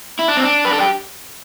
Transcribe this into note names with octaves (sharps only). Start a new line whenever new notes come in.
E4
D4
C4
D4
B4
A4
G4